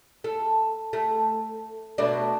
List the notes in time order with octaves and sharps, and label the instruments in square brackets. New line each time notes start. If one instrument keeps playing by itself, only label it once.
[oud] A4
A3
B2 A3 D4